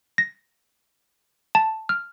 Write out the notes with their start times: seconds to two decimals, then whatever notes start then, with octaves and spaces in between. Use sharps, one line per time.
0.18 A#6
1.55 A5
1.89 F6